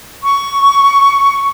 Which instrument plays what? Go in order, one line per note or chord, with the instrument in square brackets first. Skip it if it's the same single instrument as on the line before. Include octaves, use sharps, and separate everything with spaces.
[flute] C#6